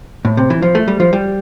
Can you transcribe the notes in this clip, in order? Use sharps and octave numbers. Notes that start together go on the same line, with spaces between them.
A2
C3
E3
F3
A3
G3
F3
G3